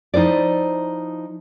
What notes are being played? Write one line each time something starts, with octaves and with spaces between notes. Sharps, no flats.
F3 D#4 E4 C5 D5